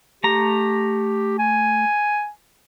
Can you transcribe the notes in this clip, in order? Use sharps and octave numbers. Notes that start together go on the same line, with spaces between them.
A3 G4 A#5
G#5